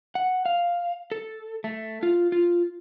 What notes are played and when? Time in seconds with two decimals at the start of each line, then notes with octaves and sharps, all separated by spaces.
0.15 F#5
0.46 F5
1.12 A4
1.64 A3
2.03 F4
2.32 F4